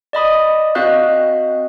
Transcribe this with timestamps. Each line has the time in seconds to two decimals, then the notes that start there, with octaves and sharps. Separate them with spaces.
0.13 D5 D#5 B5 D#6
0.75 C4 F#4 D#5 F5 F#6